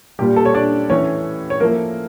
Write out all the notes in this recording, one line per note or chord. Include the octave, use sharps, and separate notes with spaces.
A#2 G3 G4
A4
C#5
D4 D5
A2 E3 A3 C#4 C#5
C#5
A2 F3 A3 A#3 A#4